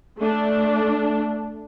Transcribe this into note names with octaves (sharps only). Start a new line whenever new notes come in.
A3 D4